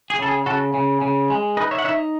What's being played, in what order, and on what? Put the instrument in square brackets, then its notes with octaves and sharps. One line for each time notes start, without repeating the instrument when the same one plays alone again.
[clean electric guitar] G#4
C#3 A4
G#4
C#3 F#4 A4
C#3
C#3
G#3
D#4 B4 D#5
C#5 E5
F#5
D#4 C#5 E5